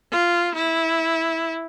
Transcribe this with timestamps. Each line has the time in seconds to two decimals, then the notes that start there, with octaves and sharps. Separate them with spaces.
0.12 F4
0.55 E4